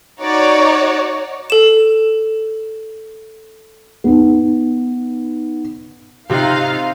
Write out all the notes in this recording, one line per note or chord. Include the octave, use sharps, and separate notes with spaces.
D#4 F#4 C#5 D5
A4 E7
B3 D#4
C3 C4 D#4 F4 G4 F5 F#6